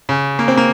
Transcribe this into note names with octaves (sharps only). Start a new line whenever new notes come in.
C#3
A#3
C4
A#3